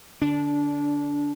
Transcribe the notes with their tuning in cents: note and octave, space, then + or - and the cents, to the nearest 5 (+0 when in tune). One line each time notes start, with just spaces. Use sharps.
D3 +0 D4 -20